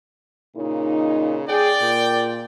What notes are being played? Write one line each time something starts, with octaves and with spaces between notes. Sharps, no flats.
A#2 C#3 D#4
G#4 D5 G5
A#2